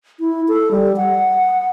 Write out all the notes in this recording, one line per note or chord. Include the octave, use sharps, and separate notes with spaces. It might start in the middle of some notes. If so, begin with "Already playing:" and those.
E4
A4
G3
F#5